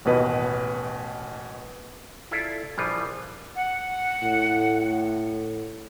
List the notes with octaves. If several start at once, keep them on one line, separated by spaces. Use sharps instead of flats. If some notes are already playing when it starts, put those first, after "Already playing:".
A1 D#2 B2 B4 D#5
E4 F4 A4 D5
A#1 E3 F3 G3 F4
F#5
A2